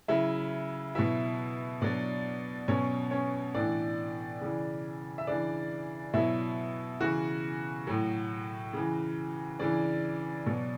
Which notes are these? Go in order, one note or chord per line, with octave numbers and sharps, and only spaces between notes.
C#3 F#3 E4 E5
B2 F#3 E4 E5
B2 F#3 D4 D5
B2 F#3 C#4 C#5
C#4 C#5
A2 E3 D4 D5
C#3 E3
E5
C#3 E3 D4 D5
B2 F#3 E4 E5
C#3 E3 F#4 F#5
A2 F#3
C#3 E3
C#3 E3 D4 D5
B2 F#3